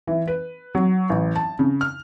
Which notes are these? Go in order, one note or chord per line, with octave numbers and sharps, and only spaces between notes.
E3
B4
F#3
A1
A5
C#3
F6